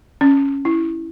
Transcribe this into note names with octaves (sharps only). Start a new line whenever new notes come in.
C#4
E4